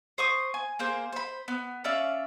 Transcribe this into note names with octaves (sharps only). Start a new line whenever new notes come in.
C5 C#6 D#6
G#5
A#3 G#4 C5 G6
C5 B5
B3
C#4 D5 E5 F5